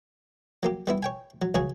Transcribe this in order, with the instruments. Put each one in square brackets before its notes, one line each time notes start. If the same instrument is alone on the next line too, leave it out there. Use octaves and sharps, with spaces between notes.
[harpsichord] F#3 A#3 G4
G3 B3 E4
C#5 G5 G#5
F#3
C#2 C#3 F#3 G#4 C#5 G#5